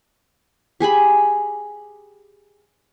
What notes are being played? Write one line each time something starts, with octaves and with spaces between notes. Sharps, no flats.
G4 G#4 G#5 B5